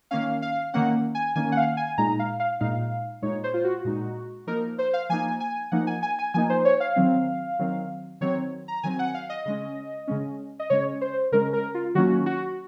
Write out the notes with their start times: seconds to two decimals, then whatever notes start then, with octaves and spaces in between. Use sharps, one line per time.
0.11 D#3 A#3 C#4 F5
0.42 F5
0.74 D#3 A#3 C#4 F#5
1.15 G#5
1.35 D#3 A#3 C#4 G#5
1.52 F#5
1.57 F5
1.77 G#5
1.98 A#2 G#3 D#4 A#5
2.19 F5
2.40 F5
2.61 A#2 G#3 D#4 F5
3.22 A#2 G#3 D#4 C#5
3.44 C5
3.54 F4
3.64 F#4
3.85 A#2 G#3 D#4
4.47 F3 A#3 D#4 A#4
4.78 C5
4.93 F5
5.09 F3 A#3 D#4 G#5
5.40 G#5
5.72 F3 A#3 D#4 F#5
5.87 G#5
6.03 G#5
6.19 G#5
6.34 F3 A#3 D#4 G#5
6.50 C5
6.65 C#5
6.80 F5
6.96 D#3 F#3 C4
7.59 D#3 F#3 C4
8.21 D#3 F#3 C4 C#5
8.68 A#5
8.83 D#3 F#3 C4 G#5
8.99 F#5
9.14 F5
9.30 D#5
9.45 C#3 G#3 C#4
10.07 C#3 G#3 C#4
10.60 D#5
10.70 C#3 G#3 C#4 C#5
11.01 C5
11.32 C#3 G#3 C#4 A#4
11.53 A#4
11.74 F4
11.95 D#3 F#3 A#3 C#4 F#4
12.26 F#4